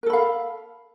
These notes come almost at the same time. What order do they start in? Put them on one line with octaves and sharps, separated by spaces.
A#4 A4 B5 F5